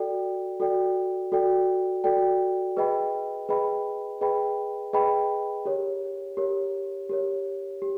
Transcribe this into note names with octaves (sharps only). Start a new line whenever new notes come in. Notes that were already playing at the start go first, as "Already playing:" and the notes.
Already playing: F#4 A4 D5 G5
F#4 A4 D5 G5
F#4 A4 D5 G5
F#4 A4 D5 G5
G#4 B4 D#5 G5 B5
G#4 B4 D#5 G5 B5
G#4 B4 D#5 G5 B5
G#4 B4 D#5 G5 B5
G4 A#4 C#5
G4 A#4 C#5
G4 A#4 C#5
G4